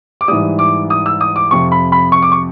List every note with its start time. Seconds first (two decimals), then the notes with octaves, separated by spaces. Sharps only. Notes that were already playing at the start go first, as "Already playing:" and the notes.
0.21 D6
0.28 G#2 E3 G3 D#6
0.59 D6
0.90 D#6
1.06 E6
1.21 D#6
1.36 D6
1.51 F2 C3 F3 C#6
1.72 B5
1.92 B5
2.12 C#6
2.23 D6
2.32 C#6